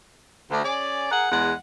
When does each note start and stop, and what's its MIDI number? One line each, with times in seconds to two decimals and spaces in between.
0.51 0.63 38
0.64 1.09 61
0.64 1.09 68
0.64 1.09 74
1.12 1.28 68
1.12 1.28 70
1.12 1.28 78
1.31 1.54 40
1.31 1.54 56
1.31 1.54 78